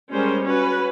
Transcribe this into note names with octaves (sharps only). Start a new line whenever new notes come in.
G3 G#3 C#4 A#4 C5
C#4 F#4 B4